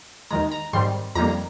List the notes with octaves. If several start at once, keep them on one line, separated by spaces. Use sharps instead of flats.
D#2 D#3 G#3 A#5
A#5
G#2 D#3 G3 C4 C6
F2 D#3 G3 A#3 A#5